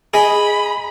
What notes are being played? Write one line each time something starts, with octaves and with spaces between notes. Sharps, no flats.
G#4 D#5 G#5 B5